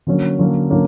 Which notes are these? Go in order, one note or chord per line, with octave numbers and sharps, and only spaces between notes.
D3 F#3 A#3 C#4
D3 F#3 A#3 C#4
D3 F#3 A#3 C#4